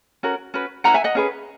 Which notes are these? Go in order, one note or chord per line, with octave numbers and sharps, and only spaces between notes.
C#4 F#4 A#4
C#4 F#4 B4
C#4 E4 B4 F#5 A#5
E5 G#5
D#5 F#5
C#4 G#4 B4